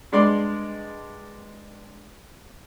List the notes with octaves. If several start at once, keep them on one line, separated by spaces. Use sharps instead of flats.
G2 G#3 D5 C6